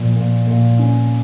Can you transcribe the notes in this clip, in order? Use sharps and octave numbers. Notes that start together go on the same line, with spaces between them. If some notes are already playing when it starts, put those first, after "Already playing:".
Already playing: A#2 F3
A#2
A#2
C#4